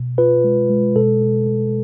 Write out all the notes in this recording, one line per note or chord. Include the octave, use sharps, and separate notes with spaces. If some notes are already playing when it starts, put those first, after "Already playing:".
Already playing: B2
F4 B4
G#3
G#3
B2 A4
B2
B2